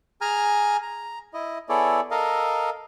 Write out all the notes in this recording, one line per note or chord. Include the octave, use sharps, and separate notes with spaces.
G#4 G#5 A#5 F6
A#5
E4 D#5
B3 E4 G#4 A4 C#5 D5
A4 A#4 D#5 F5